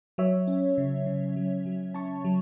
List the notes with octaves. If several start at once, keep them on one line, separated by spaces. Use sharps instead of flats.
F#3 C#5 E5
C#4
C#3
C#3
F#3
F#3
C#4 A5 C#6
F#3